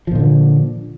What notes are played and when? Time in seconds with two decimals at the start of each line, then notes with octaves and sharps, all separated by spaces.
0.07 F3
0.11 A#2
0.15 D#3
0.19 D3